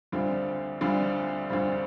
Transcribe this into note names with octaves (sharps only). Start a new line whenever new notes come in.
D2 D3 G3 C4 F4
D2 D3 G3 C4 F4
D2 D3 G3 C4 F4